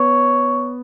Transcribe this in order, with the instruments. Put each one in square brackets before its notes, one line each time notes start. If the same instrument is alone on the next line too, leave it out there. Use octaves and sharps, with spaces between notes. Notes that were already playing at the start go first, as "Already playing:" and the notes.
Already playing: [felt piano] B3 [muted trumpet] C#5